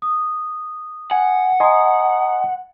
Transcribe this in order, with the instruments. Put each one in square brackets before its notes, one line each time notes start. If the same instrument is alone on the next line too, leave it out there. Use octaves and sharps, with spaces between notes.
[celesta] D#6
[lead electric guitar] F#5 [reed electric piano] G#5
[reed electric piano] D#5 G#5 C6 [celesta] A#5 D#6